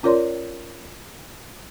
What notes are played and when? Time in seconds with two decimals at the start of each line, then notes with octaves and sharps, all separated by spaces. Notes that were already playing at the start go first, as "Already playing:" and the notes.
0.03 C#4 F4 A#4 C#5 D5 C6